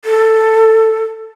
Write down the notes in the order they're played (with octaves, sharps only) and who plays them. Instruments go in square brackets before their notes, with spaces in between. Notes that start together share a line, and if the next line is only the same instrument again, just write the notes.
[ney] A4